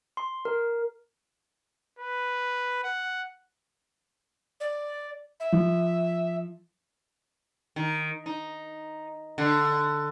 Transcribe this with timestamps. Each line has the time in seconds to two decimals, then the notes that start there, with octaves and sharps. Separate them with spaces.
0.17 C6
0.45 A#4
1.99 B4
2.84 F#5
4.60 D5
5.40 E5
5.52 F3
7.76 D#3
8.26 D#4
9.38 D3